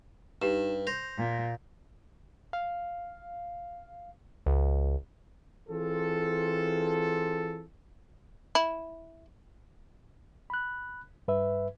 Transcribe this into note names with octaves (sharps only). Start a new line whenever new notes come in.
G2 D#4 G4 E7
C5 G6 A#6 F7
A#2
F5
C#2
E3 C4 F4 G#4 A4
E4
B5 F#6
G2 B4 E5